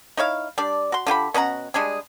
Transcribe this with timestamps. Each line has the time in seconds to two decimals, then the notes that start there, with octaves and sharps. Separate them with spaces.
0.17 D#4 E4 C#5 F5
0.58 G3 D4 D5
0.92 F#4 C6
1.07 D3 F4 G4 B5
1.34 B2 C#4 F#5 A#5
1.74 G3 G#3 D4 G#4